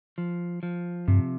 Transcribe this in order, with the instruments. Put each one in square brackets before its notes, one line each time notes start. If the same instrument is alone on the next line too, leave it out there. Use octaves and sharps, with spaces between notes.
[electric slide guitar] F3
F3
[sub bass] G2 [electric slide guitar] C3